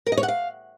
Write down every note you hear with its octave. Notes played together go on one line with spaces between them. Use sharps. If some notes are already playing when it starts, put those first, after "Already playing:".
A#4
D#5
C#5
F#5
F5